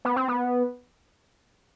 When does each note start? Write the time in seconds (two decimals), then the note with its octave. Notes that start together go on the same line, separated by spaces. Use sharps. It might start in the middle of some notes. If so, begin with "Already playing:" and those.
0.05 B3
0.16 C4
0.28 B3